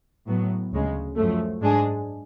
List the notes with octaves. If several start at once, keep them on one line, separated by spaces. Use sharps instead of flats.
A2 F#3 B3
D2 C#3 G#3
F#2 F3 A3
G#2 G#3 D4 G#4